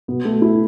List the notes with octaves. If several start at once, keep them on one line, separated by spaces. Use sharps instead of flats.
B2 B3
A3
E4